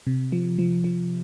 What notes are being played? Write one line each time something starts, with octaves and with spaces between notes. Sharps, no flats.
C3
F3
F3
F3